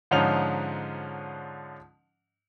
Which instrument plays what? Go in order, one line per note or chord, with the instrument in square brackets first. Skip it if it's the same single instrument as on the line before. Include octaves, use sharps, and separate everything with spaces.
[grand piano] G#2 D3 F3 C#4 D#4 F7